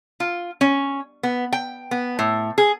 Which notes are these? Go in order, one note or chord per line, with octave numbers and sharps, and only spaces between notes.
F4
C#4
B3
G5
B3
A2
G#4